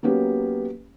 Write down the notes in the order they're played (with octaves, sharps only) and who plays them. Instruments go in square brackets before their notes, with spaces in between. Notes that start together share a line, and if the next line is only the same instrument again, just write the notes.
[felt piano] F#3 A#3 B3 C#4 G4